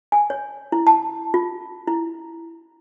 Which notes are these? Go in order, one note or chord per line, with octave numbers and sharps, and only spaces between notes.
G#5
C#5
E4
A5
F4
E4